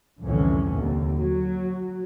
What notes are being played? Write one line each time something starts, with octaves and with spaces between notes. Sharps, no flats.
C2 F2 A2 D3 E3 C#4
D#2 D3
F#3